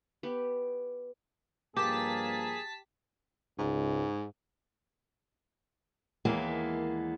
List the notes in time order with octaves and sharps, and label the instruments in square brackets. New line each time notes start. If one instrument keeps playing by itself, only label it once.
[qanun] B3 G4 B4
[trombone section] G2 F3 A#3 [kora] G4 [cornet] G#4 [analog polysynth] A5 B6
[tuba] C#2 [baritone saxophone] G#2
[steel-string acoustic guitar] D#2 E3 G#3 A#3 B3